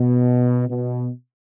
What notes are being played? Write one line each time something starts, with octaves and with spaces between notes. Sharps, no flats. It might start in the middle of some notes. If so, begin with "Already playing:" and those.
Already playing: B2
B2